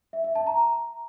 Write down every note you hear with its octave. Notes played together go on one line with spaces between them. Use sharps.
E5
E5
A5
A#5